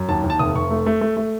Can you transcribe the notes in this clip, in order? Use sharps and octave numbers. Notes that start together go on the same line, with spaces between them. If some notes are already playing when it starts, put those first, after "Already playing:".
Already playing: F#2
D#2 A5
D#2
A5
F1 D#6
F1 C#6
A3
A3
A3
A3